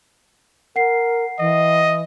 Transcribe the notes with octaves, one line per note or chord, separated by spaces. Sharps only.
A#4 F#5 C7
E3 D#5